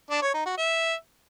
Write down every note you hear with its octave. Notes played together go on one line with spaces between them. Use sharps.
D4
C#5
D#4
F#4
E5